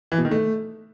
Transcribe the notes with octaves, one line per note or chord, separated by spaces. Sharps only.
E3
B2
D#3
A3